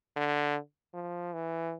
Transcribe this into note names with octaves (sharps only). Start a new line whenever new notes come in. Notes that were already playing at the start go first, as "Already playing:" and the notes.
D3
F3
E3